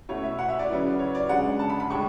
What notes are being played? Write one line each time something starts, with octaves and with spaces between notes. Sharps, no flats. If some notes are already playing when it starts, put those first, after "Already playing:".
B2 A3 C#4 E4 C#5
E5
F#5
E5
D5
C#3 F#3 B3 E4
C#5
D5
C#3 G#3 D4 F#5
A5
B5
B5
A2 G#3 D4 C#6